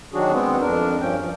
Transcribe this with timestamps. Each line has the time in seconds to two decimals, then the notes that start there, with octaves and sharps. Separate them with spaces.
0.14 D#3 F#3 D4 F#4 G#4
0.32 G#3 B3 C4
0.61 F2 D4 A#4
1.00 G2 F3 C#4 G5
1.19 F3